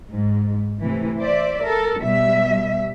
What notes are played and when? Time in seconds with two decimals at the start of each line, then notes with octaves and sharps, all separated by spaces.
0.11 G#2
0.80 C3 E3 A3
1.19 C5 D5 E5
1.62 A4 A#4
2.01 B2 G3 E5